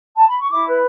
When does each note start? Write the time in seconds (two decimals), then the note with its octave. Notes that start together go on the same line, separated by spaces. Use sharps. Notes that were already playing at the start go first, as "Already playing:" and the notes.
0.15 A5
0.27 B5
0.39 C#6
0.50 E4 D6
0.65 B4